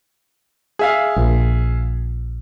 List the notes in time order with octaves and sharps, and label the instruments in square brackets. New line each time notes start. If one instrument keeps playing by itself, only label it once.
[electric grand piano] G#4 E5 F5
[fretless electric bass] A#1